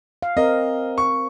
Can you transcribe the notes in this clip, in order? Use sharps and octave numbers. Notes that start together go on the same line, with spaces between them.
F5
C4 A#4 D#5
C#6